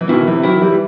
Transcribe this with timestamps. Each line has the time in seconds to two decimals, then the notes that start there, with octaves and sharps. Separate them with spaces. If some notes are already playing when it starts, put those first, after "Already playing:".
0.01 E3
0.09 B2 D#3 E4
0.27 C3 E3
0.43 D#3 F#3 E4
0.61 E3 G3